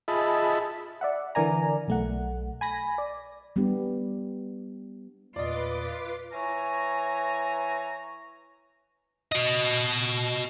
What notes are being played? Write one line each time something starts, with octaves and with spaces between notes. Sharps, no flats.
F4 G#4 D#5 E5 A5 B5
D5 E5 F#5
D3 E3 A#4 D5 G#5 A#5
B1 A3 F#5
G#5 B5 A#6
D5
G3 B3 D4 G4
E2 A#2 F4 B4 D5 D#5 D6
E3 C#5 G#5 A#5
F#4 D#5